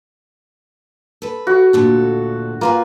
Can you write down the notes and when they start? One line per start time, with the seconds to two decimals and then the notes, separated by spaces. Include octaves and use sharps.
1.22 A4 B4
1.47 F#4
1.73 D2 A#2 A4
2.61 A#3 F4 B4 G#5